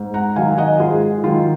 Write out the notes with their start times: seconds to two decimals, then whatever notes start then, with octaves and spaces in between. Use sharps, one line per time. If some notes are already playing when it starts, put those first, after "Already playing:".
Already playing: G#2
0.14 F#5 A#5
0.36 D#3 F#3 F5 G#5
0.58 D#5 F#5
0.80 G#2 F4 G#4
1.24 D#3 F#3 F4